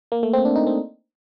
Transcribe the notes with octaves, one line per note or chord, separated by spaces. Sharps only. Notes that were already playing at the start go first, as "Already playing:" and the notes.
A#3
A3
C4
D4
D#4
C4